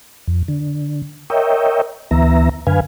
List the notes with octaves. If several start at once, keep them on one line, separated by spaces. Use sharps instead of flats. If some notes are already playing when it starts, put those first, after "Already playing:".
F2
D3
A#4 C#5 D#5 E5 G5
D2 E3 B3 E5 A#5
F#2 D3 B4 F5 G#5